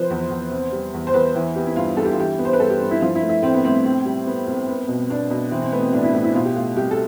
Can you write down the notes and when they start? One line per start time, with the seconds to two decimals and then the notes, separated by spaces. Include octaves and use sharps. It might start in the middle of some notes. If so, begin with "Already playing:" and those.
Already playing: C3 F3 B4 C5
0.10 E2
0.30 E2
0.51 C3
0.72 G3
0.94 E2
1.07 C5
1.14 E2 B4
1.35 E3
1.55 B3 G4
1.66 E4
1.76 G2 F4
1.97 G2 A4
2.05 G4
2.12 F4
2.18 E3 G4
2.38 B3
2.45 C5
2.53 B4
2.59 G2 A4
2.70 G4
2.81 G2
2.91 E4
3.01 F3 F4
3.15 E4
3.22 A3
3.29 E4
3.42 A2 C4
3.54 B3
3.64 A2 C4
3.84 C3 C4
4.06 G3
4.27 B3
4.47 C2
4.68 B3
4.88 B2
5.09 B3 D4
5.30 B2
5.51 E3 C4
5.62 C4
5.72 A3 B3
5.82 C4
5.92 A2 D4
6.03 E4
6.13 A2 E4
6.24 E4
6.34 B2 F4
6.45 G4
6.55 A3 F4
6.76 C2 G4
6.91 A4